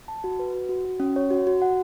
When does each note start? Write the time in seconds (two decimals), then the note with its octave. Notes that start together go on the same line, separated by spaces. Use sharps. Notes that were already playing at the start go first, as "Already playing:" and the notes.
0.08 A5
0.24 F#4
0.39 B4
0.54 F#4
0.69 F#4
0.85 F#4
1.00 C#4
1.16 C#5
1.30 F#4
1.47 F#4
1.62 F#5